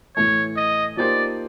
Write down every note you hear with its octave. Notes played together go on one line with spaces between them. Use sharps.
A2 E3 A3 C#5
D#5
F3 A#3 D#4 G4 C5 D5